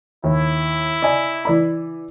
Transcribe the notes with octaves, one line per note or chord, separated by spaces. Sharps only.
D#2 E4
D5 D#5 G#5
E3 D5 B5